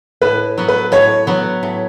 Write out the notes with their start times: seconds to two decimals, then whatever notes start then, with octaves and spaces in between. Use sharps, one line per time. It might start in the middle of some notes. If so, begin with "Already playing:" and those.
0.22 A2 B4
0.58 F#3 B3
0.68 B4
0.92 A2 C#5
1.27 F#3 B3
1.63 A2